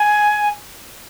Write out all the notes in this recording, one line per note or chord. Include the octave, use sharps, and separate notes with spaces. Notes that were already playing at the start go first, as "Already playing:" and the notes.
Already playing: G#5